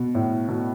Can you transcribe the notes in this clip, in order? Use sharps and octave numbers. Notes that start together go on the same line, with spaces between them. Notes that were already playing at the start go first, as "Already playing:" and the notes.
Already playing: B2
A2
B2